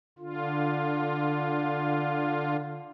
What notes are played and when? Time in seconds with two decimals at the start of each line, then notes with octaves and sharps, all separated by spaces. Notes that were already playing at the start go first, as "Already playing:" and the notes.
0.19 D3 F4